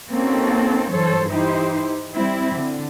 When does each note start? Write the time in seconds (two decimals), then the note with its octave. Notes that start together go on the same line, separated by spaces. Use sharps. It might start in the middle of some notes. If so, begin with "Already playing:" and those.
0.10 A#3 C4 C#4 D#4 F#4 A4
0.90 G2 E3 F#3 A4 C5 C#5
1.28 E3 D#4 E4 G4 C5
2.13 G3 C4 E4
2.56 D3